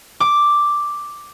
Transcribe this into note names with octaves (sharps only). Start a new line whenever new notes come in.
D6